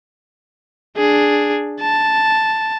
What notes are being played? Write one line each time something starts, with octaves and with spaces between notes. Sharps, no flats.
D4 G#4
A5